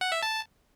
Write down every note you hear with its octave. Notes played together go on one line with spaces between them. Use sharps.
F#5
E5
A5